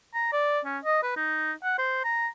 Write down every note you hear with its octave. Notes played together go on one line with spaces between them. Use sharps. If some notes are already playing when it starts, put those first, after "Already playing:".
A#5
D5
C#4
D#5
B4
D#4
F#5
C5
A#5